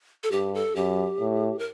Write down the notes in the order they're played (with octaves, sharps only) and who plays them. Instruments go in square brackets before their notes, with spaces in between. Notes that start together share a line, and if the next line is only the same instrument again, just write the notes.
[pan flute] A4
[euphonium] G2 [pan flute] G4
[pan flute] A4
[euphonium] F#2 [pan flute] G4
[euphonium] A2
[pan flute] A#4